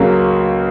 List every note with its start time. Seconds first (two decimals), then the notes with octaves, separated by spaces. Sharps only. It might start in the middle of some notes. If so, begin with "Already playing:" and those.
Already playing: C#2 C#3 F#3 A#3